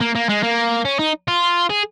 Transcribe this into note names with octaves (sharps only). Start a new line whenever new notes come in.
A#3
A#3
G#3
A#3
C#4
D#4
F4
G#4